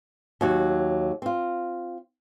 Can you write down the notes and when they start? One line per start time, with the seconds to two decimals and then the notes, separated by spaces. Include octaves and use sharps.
0.41 D#2 F#3 F#4
1.22 C4 F4